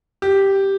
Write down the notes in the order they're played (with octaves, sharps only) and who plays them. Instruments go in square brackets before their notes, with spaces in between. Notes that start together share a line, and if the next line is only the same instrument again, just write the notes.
[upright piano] G4